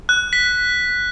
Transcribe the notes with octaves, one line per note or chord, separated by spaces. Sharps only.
F#6
B6